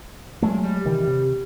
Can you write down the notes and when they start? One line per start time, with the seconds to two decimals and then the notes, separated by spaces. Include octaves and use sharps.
0.42 A#2 F#3 G#3 A3
0.63 G3
0.85 C3 D#3 E3
1.07 C3